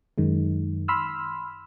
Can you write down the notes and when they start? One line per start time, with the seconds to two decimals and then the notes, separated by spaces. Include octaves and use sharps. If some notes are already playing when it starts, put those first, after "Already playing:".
0.18 F#2 D#3 G#3
0.88 B5 C6 E6 F6